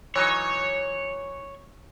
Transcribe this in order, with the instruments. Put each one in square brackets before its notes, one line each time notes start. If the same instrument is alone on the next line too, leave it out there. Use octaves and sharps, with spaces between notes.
[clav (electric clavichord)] E3 F#3 D#4 [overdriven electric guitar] C#5